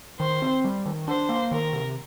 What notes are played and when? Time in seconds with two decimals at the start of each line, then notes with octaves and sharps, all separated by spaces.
0.20 D#3 C5
0.42 C4
0.64 G3
0.86 D#3
1.08 D4 C5
1.29 A#3
1.51 D#3 A#4
1.73 C3